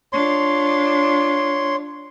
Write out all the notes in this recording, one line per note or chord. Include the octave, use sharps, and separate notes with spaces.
D4 F4 C#5 C6